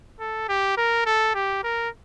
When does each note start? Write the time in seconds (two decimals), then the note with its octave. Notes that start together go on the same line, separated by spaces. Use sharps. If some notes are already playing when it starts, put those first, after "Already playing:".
0.20 A4
0.49 G4
0.77 A#4
1.06 A4
1.35 G4
1.63 A#4